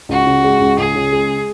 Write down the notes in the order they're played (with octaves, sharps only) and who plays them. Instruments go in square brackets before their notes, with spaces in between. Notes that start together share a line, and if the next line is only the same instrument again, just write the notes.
[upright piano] C#2 [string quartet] F#4
[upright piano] C#3
G#3
C#2
[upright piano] C#2 [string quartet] G#4
[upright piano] C#3
G#3